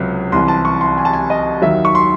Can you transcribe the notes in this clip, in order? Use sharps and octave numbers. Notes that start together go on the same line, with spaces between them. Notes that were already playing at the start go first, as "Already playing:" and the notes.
Already playing: C#2 C3 F#3
C2 C3 E3 C6
A5
C#6
C6
G#5
A5
G#5
D#5
D#2 D#3 F#3 E5
C#6
C6